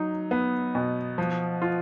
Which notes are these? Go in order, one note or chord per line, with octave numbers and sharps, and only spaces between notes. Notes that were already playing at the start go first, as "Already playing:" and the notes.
Already playing: F#3 D#4
B3
B2
F3
F4